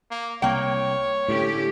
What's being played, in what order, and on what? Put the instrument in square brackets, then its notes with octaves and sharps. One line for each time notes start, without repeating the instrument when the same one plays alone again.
[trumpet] A#3
[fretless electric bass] C2 [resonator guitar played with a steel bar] A#3 G5 [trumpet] C#5
[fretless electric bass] A2 D3 [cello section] A3 C#4 G4